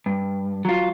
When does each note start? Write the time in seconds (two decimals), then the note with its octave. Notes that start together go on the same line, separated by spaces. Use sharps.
0.06 G2
0.65 F#3 F4